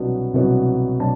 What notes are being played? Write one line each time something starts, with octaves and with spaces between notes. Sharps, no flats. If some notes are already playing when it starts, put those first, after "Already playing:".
Already playing: C2 B2 F#3 B3 D4
C2 B2 F#3 B3 D4
B2 F#3 D4 A5